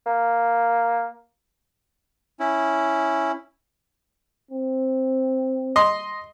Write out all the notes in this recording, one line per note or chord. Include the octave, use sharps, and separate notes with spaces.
A#3
C#4 E4
C4
D#5 C6